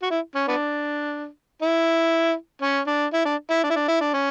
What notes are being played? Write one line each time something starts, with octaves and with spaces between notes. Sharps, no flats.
F#4
E4
C#4
B3 D4
E4
C#4
D4
E4
D4
E4
D4
E4
D4
E4
D4
C#4